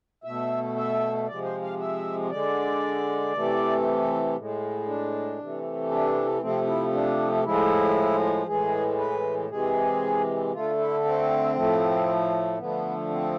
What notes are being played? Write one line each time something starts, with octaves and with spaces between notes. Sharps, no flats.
B2 A3 E5
E5
C3 F3 G#3 D5
C5
F5
E5
D3 G#3 D5
C3 E3 A3
A2 G#3
D4
C3 E3 A3
D4
C3 F3 A3 C4
E4
D4
A2 F3 G#3 E4
A2 E3 G#3 G#4
B4
C3 E3 G#3 G#4
D3 A3 F4
E4
C4
A2 F3 A3
D3 F3 A3 B3
C4